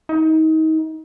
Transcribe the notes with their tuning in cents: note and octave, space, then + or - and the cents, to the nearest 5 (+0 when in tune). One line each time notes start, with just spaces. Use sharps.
D#4 +30